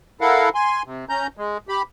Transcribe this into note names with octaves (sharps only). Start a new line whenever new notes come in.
E4 A4 A#4 F5 F#5
G#5 C6
C3
C#4 A#5 G6
G#3
G4 B5